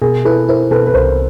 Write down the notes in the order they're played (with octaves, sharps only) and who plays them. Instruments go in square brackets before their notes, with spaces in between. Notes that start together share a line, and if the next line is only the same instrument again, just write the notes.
[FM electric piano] B2 [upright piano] G#4 A#4
[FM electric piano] E4 [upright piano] A4 B4
[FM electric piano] E4 [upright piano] A#4 C5
[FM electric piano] B2 [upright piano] A4 B4
[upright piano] B4
[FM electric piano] C2 [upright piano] A#4 C5